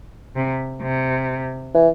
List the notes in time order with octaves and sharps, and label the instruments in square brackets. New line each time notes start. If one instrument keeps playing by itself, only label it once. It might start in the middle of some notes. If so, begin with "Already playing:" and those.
[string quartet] C3
C3
[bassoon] E3